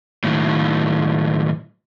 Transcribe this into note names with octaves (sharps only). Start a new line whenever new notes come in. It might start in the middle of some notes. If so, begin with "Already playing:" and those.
D#2 A2